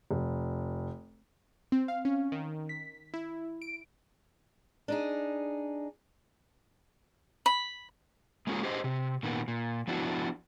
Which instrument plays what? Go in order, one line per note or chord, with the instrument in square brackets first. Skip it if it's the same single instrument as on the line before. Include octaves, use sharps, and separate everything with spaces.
[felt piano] F1
[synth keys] C4
F5
C#4
D#3
B6
E4
D7
[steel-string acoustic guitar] D4 D#4 G#4
[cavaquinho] B5
[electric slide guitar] G#3 A#3 C#4 F4 G#4
G4 G#4 C5 D#5
C3
A#2 D#3 B3
A#2
F3 B3 D4 E4 F#4